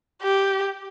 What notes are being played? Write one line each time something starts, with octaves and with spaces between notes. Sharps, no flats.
G4